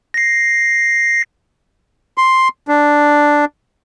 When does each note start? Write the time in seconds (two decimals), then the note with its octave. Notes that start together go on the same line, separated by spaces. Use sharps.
0.14 A#6 C7
2.18 C6
2.68 D4